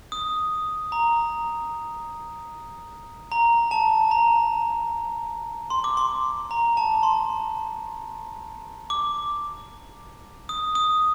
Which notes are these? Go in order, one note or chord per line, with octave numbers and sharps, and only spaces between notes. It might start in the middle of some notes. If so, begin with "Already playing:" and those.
D#6
A#5
A#5
A5
A#5
C6
D6
C6
A#5
A5
C6
D6
D#6
D#6